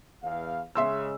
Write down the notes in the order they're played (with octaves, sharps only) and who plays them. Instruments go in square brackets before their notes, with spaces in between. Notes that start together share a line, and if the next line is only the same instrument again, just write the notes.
[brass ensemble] E2 F5
[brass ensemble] C#3 G#3 [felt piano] E5 C6 E6